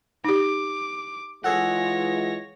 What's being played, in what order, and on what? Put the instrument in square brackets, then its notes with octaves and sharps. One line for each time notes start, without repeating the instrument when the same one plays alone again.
[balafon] D#4 G4 [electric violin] D6
[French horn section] E3 G#3 F4 [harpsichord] G#4 A4 F#5 [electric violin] C#5 A#6